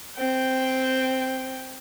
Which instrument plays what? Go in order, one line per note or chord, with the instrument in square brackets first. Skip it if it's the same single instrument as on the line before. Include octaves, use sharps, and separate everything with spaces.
[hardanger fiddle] C4 G5